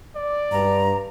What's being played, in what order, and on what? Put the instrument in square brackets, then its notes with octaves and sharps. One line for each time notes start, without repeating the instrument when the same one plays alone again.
[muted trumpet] D5
[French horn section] G2 [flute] A#5